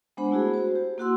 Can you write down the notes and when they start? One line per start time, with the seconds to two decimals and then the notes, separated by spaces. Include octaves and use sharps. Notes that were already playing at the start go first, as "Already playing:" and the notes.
0.17 G#3 B3 D4 C5 F#5 B5
0.31 A3 E4 F#4 G#4
0.54 F#4 C5
0.75 G4
0.98 A#3 E4 F#4 F#5 C6 E6